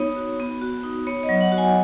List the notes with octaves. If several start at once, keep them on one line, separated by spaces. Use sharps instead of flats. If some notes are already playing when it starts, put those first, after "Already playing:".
Already playing: B3 D#4 C#5
F#4
B3
F#4
D#4
B3 C#5
D#5
F#3
F#5
F#4
G#5